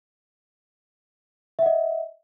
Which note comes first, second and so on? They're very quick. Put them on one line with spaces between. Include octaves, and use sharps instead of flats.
E5 F#5 D#5